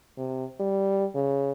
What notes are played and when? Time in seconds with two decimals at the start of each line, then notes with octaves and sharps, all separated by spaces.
0.17 C3
0.60 G3
1.15 C#3